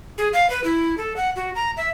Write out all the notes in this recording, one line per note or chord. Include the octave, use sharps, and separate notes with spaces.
G#4
F5
B4
E4
A4
F#5
F#4
A#5
E5